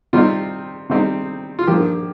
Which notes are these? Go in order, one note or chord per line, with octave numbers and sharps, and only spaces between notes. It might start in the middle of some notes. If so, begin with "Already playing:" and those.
C3 G3 C4 D#4 F4
C3 G3 C4 D#4
F4
G2 F3 A#3 G4